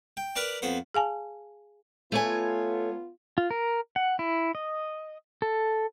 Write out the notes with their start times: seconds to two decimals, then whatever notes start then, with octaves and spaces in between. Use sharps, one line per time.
0.17 G5
0.36 A#4 B4 D5 A5
0.62 F2 B3 C5
0.94 G#4 F5 G#5 A5
2.12 A3 B3 F4 C#5 G#5
3.38 F4
3.51 A#4
3.96 F#5
4.19 E4
4.55 D#5
5.42 A4